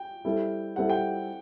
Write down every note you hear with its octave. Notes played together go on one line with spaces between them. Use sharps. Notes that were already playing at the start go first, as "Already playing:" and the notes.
Already playing: G5
G3 C4 E4 A4
G3 C4 E4 A4 F#5
G5